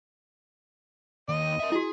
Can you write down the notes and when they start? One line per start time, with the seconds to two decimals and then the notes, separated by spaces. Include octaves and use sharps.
1.29 D#2 D#5
1.60 A#4 E5
1.72 E4 F#4 G#4